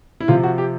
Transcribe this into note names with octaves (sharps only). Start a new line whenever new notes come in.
E4
C3 F3 F4
F#4
G4